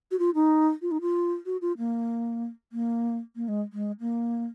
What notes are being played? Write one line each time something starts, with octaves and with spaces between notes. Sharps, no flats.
F#4
F4
D#4
F4
D#4
F4
F#4
F4
A#3
A#3
A#3
G#3
G#3
A#3